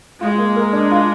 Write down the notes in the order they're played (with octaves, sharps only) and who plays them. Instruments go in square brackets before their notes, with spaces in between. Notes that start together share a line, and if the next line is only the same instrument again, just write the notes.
[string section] G#3 [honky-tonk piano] F4
[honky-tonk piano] A#3
A#4
D4
F4